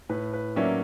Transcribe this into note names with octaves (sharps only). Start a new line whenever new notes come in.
A2 B4
B4
F#3 A#3 C#4 E4 D5 E5